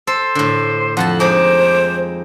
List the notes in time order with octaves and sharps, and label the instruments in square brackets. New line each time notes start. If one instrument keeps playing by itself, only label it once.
[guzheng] A4 [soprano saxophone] C5
[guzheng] A2 D3
[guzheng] F2 F3 A5 [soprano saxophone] F#5
[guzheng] G#3 D#4 [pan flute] C5 [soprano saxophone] D6